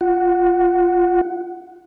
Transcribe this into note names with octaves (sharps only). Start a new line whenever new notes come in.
F4 F#5